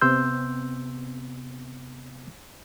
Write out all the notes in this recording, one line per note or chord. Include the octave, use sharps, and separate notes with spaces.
C3 B3 C4 C6 E6 G6